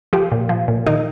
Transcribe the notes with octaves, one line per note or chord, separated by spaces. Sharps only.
F3 G4
A#2
F3
A#2
D#3 D#4